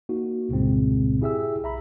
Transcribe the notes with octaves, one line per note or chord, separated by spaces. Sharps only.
A#3 D#4 F#4
C2 G2 A#2 C#3 G#3 C4
E4 G4 G#4 E5 G5 E6
B1 E5 A#5 B5